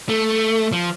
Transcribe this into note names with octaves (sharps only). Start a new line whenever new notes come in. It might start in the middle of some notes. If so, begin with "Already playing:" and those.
A3
F3